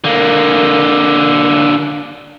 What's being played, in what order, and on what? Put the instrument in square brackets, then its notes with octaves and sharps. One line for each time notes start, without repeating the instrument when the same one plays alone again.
[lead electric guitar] D3 A#3